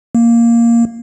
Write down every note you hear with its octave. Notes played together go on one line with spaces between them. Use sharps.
A#3